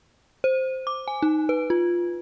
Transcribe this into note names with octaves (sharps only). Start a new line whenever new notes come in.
C5
D6
G#5
D#4
B4
F4